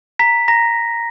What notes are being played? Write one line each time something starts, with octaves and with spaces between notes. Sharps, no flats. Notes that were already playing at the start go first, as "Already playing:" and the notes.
A#5 B6
A#5 A#6